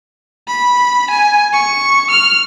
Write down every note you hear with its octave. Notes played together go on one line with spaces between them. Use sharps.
B5
G#5
C#6
F6